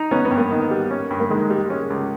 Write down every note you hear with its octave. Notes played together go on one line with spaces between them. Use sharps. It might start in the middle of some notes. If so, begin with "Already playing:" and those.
Already playing: D#4
B3 C#4
B3
G2
A#3
D#3
G3
C#4
G2
A#3
D#3 G#3
G3
C#4
C#2